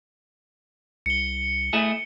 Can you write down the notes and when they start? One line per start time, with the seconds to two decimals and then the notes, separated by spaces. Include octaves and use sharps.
1.06 C2 C#7 G7
1.73 A3 E4 G#4